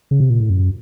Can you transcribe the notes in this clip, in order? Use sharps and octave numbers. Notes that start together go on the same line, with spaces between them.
C#3
C3
A#2
A2
F#2